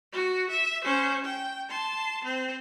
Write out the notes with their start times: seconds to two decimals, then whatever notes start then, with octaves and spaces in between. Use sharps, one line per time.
0.13 F#4
0.50 E5
0.84 C#4 C5
1.25 G5
1.70 A5 C6
2.25 C4 C5